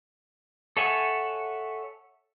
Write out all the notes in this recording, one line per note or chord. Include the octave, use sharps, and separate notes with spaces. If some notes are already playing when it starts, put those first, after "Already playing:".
A4 C#5 E5 F#5 G#5